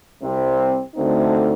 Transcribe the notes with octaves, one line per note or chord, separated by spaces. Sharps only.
C2 C3 G3 C4
D2 D3 A3 C4 D#4